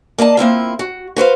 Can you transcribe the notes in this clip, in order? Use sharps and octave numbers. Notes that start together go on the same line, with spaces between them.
A#3 D5 D#5 A5
A#3 C4 E4 F4
F#4
F#4 B4 C5 F5